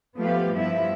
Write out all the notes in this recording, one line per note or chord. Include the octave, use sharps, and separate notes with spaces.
F3 A3 B3 G4 B4 F5
G2 F3 G3 B3 E4 E5